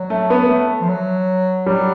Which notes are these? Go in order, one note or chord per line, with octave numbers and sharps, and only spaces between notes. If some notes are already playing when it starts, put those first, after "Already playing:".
Already playing: F#3
A3
B3
A3
F3
F#3
F#3 G3